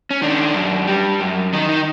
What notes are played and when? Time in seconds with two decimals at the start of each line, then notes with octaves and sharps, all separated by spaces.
0.11 C#4
0.22 D#3 D4
0.54 F#2
0.87 G3
1.20 F#2
1.53 D#3 D#4
1.69 D#4